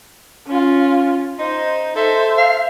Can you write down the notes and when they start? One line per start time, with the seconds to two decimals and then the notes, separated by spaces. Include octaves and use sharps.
0.47 C#4 F4
1.39 D#4 C5
1.95 A4 C5 E5
2.38 F5